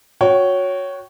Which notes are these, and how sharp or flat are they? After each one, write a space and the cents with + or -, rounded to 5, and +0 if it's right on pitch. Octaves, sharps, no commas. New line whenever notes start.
F#4 -25 C#5 +0 G5 -30